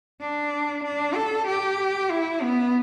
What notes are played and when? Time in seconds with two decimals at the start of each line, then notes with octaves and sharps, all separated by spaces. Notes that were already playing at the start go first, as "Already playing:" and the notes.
0.21 D4
0.84 D4
1.15 A4
1.47 G4
2.11 E4
2.42 B3